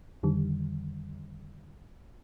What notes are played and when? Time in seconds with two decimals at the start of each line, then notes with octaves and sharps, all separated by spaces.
0.23 F2 D3 D#3 G3